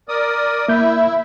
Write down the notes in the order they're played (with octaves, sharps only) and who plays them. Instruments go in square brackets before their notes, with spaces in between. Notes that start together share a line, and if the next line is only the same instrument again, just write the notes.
[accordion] A#4 D5 D#6
[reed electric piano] A#3 G6 [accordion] E4 E5